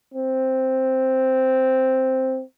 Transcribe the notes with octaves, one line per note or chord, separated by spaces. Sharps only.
C4